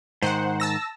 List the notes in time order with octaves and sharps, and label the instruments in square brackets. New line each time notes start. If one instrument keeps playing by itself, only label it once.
[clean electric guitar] G#2 D#3 [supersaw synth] C5 F#5
[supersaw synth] A5 E6 A#6